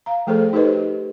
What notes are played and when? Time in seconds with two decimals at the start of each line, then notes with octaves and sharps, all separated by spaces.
0.06 F5 A#5
0.27 F3 A3 G#4 A4 C5
0.53 D#4 G4 A4 B4 C5 D#5